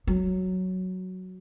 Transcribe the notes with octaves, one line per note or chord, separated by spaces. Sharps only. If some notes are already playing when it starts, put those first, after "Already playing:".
F#3